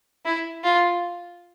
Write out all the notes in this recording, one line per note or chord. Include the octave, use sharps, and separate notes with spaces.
E4
F4